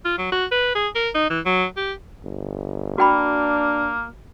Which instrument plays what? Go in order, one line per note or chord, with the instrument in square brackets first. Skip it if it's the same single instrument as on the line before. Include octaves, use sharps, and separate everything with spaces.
[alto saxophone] F4
F#3
F#4
B4
G#4
A#4
D#4
E3
F#3
G4
[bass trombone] G1
[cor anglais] A#3 [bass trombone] D4 [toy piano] F#4 G5 B5